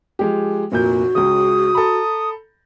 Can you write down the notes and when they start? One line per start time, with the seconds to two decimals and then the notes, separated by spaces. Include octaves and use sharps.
0.19 F3 G#3 G4
0.72 F1 A#2 F#4 G6
1.15 C#2 C#3 D#6
1.75 A4 A#5 B5